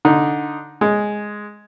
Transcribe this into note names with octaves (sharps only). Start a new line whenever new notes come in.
D3 D#4
G#3